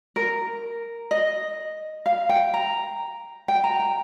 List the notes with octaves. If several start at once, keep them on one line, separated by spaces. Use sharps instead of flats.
A#4
D#5
F5
G5
A#5
G5
A#5
G5